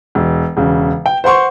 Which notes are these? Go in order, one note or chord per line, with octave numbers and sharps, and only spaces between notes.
E1
E1 C#3
G5
C5 F#5 C6 C#6